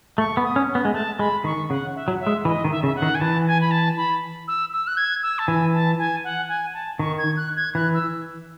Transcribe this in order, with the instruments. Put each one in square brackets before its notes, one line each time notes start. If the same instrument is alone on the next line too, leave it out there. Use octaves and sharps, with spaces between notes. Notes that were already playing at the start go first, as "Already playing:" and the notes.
[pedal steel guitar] A3 [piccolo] C#6
[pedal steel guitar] B3
[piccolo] D#6
[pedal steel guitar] C#4
B3
G#3
[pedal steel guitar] A3 [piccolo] A5
[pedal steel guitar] G#3 [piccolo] B5
[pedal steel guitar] D#3 [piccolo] C#6
[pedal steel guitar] C#3 [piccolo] F#5
[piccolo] E5
[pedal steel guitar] F#3
[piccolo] E5
[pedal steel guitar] G#3
[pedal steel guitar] E3 [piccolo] D#5
[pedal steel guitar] D#3
[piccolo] E5
[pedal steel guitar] C#3 [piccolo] E5
[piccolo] F#5
[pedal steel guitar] D#3
[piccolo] G#5
[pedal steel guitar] E3 [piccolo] A5
[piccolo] G#5
B5
A5
B5
E6
E6
F#6
G#6
E6
A5
[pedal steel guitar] E3 [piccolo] G#5
[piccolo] A5
G#5
F#5
G#5
A5
[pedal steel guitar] D#3 [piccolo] C#6
[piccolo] G#6
F#6
G#6
[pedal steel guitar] E3 [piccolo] F#6
[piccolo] E6